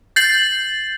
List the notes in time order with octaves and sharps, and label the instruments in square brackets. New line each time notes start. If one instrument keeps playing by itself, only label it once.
[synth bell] G6 A6 C7 F#7